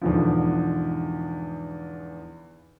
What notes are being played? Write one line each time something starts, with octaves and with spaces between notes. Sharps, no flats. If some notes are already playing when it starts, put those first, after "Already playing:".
E2 G#2 B2 D3 F3